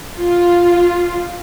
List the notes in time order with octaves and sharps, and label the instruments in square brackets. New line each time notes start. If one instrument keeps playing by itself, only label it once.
[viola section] F4